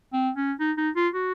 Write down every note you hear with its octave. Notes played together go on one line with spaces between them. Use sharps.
C4
C#4
D#4
D#4
F4
F#4